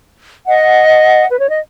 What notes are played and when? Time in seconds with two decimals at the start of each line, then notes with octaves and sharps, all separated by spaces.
0.46 D#5 F#5
1.30 B4
1.39 C#5
1.48 D#5